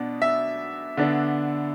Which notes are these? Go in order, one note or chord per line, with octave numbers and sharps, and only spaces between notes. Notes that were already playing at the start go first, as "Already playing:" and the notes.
Already playing: B2 B3 D4
E5
D3 B3 D4